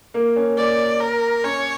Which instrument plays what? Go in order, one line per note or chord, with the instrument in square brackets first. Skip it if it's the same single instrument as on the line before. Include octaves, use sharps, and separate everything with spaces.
[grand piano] A#3
C#4
[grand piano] A#3 [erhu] D5
[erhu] A#4
[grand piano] C#4 [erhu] C#5